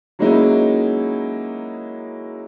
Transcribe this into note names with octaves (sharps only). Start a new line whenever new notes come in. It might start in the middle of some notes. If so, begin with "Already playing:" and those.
F#3 G#3 A#3 C#4 D#4 E4